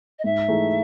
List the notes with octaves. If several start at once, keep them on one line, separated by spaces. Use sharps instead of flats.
D#5
G#2 E5
E3 A3 D#4 G#4